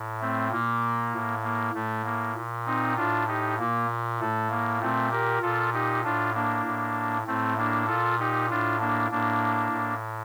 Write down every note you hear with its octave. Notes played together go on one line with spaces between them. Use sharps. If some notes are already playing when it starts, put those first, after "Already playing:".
Already playing: A2
A3 C4
A#2 A#3
A2
A#3
A2 A3
A#3
A#2
C4 D#4
A2 D4 F4
D#4 G4
A#2 A#3
A2 A3
A#3
A#2 A3 C4
G4 A#4
A#2 F4 A4
D#4 G4
A2 D4 F4
A#3 D4
A2
A2 A3 C4
A#3 D4
A#2 F4 A4
D#4 G4
A2 D4 F4
A#3 D4
A2 A#3 D4
A2